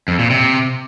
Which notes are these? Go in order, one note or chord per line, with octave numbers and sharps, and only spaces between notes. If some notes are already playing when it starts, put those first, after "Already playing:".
F2
A#2
C3